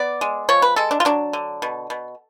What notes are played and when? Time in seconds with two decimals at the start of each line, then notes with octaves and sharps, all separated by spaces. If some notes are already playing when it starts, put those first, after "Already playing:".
Already playing: B3 D5
0.21 G#3
0.49 F3 C#5
0.62 B4
0.76 G#3 A4
0.91 D4
1.00 F4
1.05 F#3 D4
1.33 D3
1.62 B2
1.90 B2